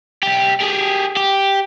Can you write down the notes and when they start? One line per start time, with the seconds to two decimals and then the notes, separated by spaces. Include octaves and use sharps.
0.23 B1 G4
0.60 G4 G#4
1.17 G4